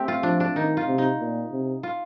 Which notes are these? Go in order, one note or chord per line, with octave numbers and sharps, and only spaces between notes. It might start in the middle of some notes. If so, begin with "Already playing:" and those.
Already playing: A3 C4 G4
F4
F3 D4
D4
D#3 D#4
F4
C3
D#4
A#2
C3
F4